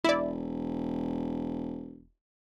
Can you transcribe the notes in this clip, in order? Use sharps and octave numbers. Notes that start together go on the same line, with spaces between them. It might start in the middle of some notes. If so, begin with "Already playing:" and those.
E1 E4 D5